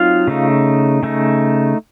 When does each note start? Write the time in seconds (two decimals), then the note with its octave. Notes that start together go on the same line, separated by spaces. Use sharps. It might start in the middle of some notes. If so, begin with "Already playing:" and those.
Already playing: F#3 C4 D#4 F4 F5
0.28 C#3 A3 D#4
1.03 C#3 A3 D#4